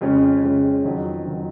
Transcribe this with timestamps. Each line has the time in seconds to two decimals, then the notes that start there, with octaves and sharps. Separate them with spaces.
0.01 F2 C#3 G#3 C#4
0.43 F2 C#3 G#3 C#4
0.84 F2 D#3 F#3
1.25 F2 D#3 F#3